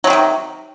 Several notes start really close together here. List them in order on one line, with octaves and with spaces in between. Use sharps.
F#3 F3 D#3 C3